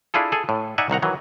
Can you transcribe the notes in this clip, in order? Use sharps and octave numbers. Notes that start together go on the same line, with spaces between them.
D4 E4 F4 G#4 A4
G#4 A4
A2
D#4 D5 E5 F#5 G#5
C2 D#3 F#5 A#5
D#3 E3 F#3